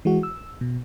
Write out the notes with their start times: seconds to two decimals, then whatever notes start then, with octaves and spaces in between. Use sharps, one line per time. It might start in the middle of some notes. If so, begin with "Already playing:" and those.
0.05 E3 G#3 F#4
0.23 E6
0.61 B2